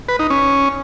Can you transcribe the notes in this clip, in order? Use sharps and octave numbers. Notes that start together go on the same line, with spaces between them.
B4
D#4
C#4